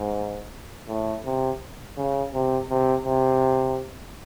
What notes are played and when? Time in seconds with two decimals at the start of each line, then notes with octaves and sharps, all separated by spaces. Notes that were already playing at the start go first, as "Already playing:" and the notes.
Already playing: G#2
0.89 A2
1.25 C3
1.97 C#3
2.34 C3
2.70 C3
3.06 C3